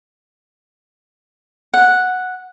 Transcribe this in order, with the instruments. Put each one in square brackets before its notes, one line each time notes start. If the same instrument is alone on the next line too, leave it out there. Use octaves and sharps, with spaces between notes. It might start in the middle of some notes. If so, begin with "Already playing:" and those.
[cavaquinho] F#5